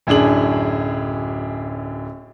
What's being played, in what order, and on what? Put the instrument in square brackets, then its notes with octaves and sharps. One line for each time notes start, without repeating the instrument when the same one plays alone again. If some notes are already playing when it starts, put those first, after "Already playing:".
[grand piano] D1 F#2 D4 G#4 F#7